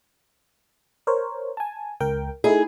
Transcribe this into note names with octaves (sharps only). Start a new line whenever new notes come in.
A#4 C5 C#5
G#5 A5
C#2 A#4 G5
A3 D#4 E4 G#4